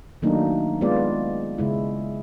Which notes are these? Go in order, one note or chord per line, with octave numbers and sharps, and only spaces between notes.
D#3 F#3 A3 A#3 D4 D#4
G#3 B3 F4 D5
C#3 G#3 E4